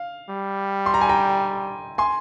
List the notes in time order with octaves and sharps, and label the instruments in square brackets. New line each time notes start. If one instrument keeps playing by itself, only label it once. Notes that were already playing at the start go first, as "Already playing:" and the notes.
Already playing: [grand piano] F5
[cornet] G3
[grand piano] C6
A#5
G#5
G5 A#5
G#5 C6